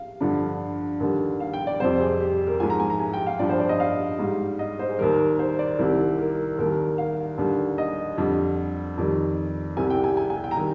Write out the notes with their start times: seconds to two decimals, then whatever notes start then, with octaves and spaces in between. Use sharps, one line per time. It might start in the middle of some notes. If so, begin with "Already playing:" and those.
Already playing: F5
0.21 G2 D3 F3
1.00 D#2 D3 G3
1.40 F5
1.53 G5
1.67 D5
1.80 F2 C3 G3 C5
2.00 G#4
2.20 G4
2.47 A#4
2.60 G#2 F3 G#5
2.70 A#5
2.80 G#5
2.90 A#5
3.00 G#5
3.13 G5
3.26 F5
3.39 G2 F3 D5
3.49 C5
3.60 D5
3.69 D#5
3.80 F5
4.19 G#2 G3
4.59 D#5
4.79 C5
4.89 G#4
4.99 D#2 D#3 G3 A#4
5.39 C5
5.59 D5
5.79 C2 C3 D#3 G3
6.19 A#4
6.58 D#2 D#3 G3 A#4
6.98 F5
7.38 D#2 D3 G3
7.78 D#5
8.18 F2 D3 G3
8.97 F2 D#3 G3
9.77 C2 C3 G3 G#5
9.90 G5
10.04 G#5
10.17 G#5
10.30 G#5
10.44 G5
10.51 A#5
10.57 D#3 G3 G#5